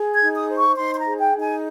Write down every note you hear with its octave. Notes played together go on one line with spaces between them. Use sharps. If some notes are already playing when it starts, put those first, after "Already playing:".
Already playing: G#4
G#6
D#4
D#6
C5
C#6
D#4 C6
C6
A#5
G#4
G5
D#4
G#5